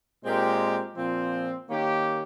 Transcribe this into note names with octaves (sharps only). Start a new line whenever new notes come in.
A#2 G#3 C4 G4 A#4
A#2 F3 C4
D#3 A#3 C#4 G4